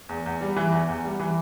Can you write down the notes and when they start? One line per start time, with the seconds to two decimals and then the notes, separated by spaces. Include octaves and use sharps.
0.09 E2
0.26 E2
0.41 G3
0.56 E3
0.72 E2
0.88 E2
1.04 G3
1.20 E3